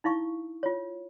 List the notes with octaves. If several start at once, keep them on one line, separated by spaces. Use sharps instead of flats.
D#4 E4 F5 C#6
F4 C#5